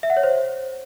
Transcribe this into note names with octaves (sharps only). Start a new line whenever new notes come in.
E5
F#5
C#5
C5